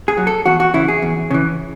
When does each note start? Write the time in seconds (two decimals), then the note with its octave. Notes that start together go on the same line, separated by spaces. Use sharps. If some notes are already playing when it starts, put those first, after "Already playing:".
0.08 G#4
0.17 F#3
0.27 A4
0.46 E2 F#4
0.60 F#4
0.74 C#3 E3 E4
0.88 G#4
1.02 E2
1.30 C#3 E3